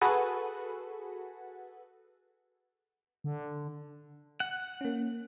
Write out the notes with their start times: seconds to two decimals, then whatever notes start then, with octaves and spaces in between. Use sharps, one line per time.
0.01 F#4 G#4 A4 B4 F#5
3.24 D3
4.40 F#5
4.81 A#3 C#4